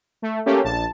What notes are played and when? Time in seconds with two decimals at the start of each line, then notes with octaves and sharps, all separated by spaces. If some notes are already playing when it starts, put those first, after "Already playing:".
0.22 A3
0.46 A3 A#3 C#4 G4
0.64 A#1 A5